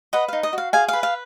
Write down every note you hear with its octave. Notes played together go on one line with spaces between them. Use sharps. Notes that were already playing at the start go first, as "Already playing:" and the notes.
B4 D#5 F#5
D#4 F5
D#5
F#4 F5
G#4 F5 G#5
B4 F5
F5